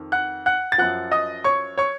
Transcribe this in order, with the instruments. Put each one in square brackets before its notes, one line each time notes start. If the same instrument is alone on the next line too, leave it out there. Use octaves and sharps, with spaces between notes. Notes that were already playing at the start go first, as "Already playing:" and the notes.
Already playing: [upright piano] F2 D#3
F#5 F#6
F#5 F#6
A6
F#2 F3 F#5 F#6
D#5 D#6
C#5 C#6
C#5 C#6